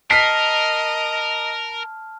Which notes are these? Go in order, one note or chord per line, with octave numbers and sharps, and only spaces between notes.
A#4 D#5 A5 F6 B6 C7